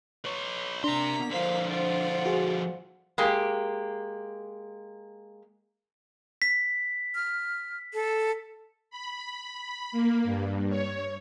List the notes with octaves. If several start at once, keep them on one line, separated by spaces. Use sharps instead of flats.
B4 C#5
C3 A#3 D4 A#5 C6 B6
D3 F3 C5 F5
F4 C5 D5 F#5
F#4 G#4
G#3 A#3 G4
B6
F6
A4
B5
A#3
G2
C#5